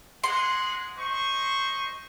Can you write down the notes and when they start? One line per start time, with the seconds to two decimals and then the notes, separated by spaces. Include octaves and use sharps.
0.24 G#3 G#4 F#5 C6
0.98 C5 D#5 C#6